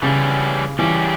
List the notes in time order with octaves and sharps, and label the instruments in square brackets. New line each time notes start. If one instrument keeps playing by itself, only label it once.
[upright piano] C#3 [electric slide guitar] E3 G3 C#4
[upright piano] E3 [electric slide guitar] G3 C#4 G4